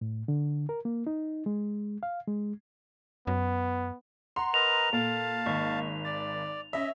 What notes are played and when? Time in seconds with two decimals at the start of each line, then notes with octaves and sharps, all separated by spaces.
0.01 A2
0.28 D3
0.69 A#4
0.85 A#3
1.07 D#4
1.46 G#3
2.03 F5
2.28 G#3
3.27 F#2 B3
4.36 F#5 A#5 C6
4.54 A#4 B4 D#5 F7
4.93 A#2 A4 F5 A5
5.46 G#1 A#3 D#5 C#6
6.05 D5 A6
6.73 C#4 D#5 E5